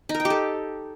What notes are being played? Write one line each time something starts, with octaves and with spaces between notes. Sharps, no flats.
D#4
A#4
G5
G4
A4